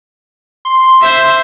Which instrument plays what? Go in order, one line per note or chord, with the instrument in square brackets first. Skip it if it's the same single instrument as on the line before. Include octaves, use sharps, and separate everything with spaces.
[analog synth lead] C6
[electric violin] C5 E5